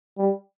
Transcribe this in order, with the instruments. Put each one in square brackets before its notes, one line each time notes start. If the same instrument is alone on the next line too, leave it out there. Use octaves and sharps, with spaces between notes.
[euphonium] G3